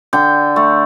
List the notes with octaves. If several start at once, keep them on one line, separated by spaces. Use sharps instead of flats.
D3 G5
A3